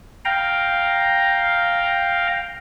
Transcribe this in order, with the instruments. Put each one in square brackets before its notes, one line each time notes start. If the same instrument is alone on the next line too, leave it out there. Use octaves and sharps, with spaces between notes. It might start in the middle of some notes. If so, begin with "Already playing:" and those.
[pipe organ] F5 G5 A#5